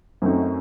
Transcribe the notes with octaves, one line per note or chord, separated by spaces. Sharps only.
F#2 F#3 A3 C4 D#4